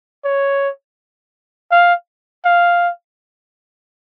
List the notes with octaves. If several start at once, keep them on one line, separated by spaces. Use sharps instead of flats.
C#5
F5
F5